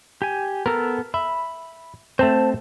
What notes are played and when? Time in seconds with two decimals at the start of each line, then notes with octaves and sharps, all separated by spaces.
0.22 G4 G#5
0.66 B3 A4 A#4 F6
1.14 E5 B5
2.19 A3 C4 C5 A5